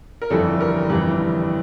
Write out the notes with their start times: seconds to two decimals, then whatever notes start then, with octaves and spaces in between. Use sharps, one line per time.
0.22 A#4
0.30 G1 F2 E3 G3 A4
0.61 A#4
0.89 G1 F2 E3 G3